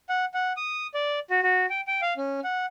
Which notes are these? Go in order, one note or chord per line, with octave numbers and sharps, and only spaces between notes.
F#5
F#5
D#6
D5
F#4
F#4
G5
G5
F5
C#4
F#5